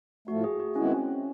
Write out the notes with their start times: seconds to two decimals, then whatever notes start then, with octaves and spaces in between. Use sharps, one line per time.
0.28 A2 F3 A3 F#4
0.44 G#4
0.60 F#4
0.76 D#3 G#3 B3 C#4 E4
0.85 C4
0.94 C#4